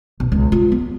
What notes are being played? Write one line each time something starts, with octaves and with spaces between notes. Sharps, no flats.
B1
C#2
F4
B3